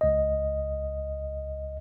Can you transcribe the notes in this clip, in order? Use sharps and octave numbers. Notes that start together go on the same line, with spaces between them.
C#2 D#5